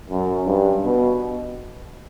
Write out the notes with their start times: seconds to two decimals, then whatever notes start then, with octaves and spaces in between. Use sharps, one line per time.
0.10 F#2
0.47 G2
0.84 B2